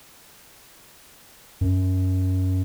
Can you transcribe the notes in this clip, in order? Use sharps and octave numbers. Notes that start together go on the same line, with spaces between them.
F#2